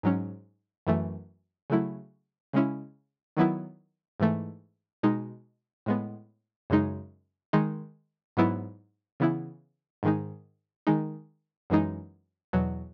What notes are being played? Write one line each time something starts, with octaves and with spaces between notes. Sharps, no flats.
G#2 F#3 C#4
F#2 E3 A3
C#3 F#3 A3 E4
C#3 G#3 C#4 E4
D#3 F#3 B3 E4
G#2 E3 A3
B2 G#3 D#4
A2 G#3 B3
F#2 C#3 G#3 D#4
D#3 G#3 D#4
G#2 F#3 B3 E4
C#3 E3 B3 E4
G#2 D#3 G#3 D#4
D#3 G#3 D#4
F#2 E3 G#3 D#4
E2 B2 F#3